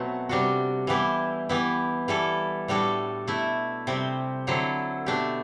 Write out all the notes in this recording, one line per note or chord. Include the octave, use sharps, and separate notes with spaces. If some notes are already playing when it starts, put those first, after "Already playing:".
Already playing: B2 F#3 A3 C4 F#4
C3 G3 D4 F#4
E3 G3 B3 E4 G4
E3 B3 E4 G4
E3 G3 B3 E4 A4
A2 G3 D4 F#4 A4
B2 A3 E4
C3 G3 C4 G4
D3 F#3 C4 E4 A4
B2 A3 D4 G4